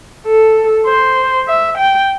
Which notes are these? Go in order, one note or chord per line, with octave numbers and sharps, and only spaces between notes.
A4
C5
E5
G5